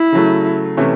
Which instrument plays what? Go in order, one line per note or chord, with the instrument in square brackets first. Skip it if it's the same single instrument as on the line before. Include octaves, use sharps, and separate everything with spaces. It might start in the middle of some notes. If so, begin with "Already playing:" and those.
Already playing: [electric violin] E4
[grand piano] C#3 F#3 A3
C3 E3 A3 C#4 E4